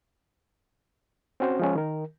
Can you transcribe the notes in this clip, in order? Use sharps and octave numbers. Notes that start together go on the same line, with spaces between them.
C4 C#4 F#4 C5
F3 G#3 C#4
D#3 A#4